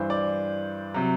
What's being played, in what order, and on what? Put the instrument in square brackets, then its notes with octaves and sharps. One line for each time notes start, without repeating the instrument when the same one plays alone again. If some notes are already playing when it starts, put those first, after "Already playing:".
Already playing: [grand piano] G2 E3 C5
D5
C3 F#3